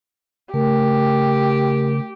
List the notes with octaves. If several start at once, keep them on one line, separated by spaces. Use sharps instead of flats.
C#3 A3 G4 A#4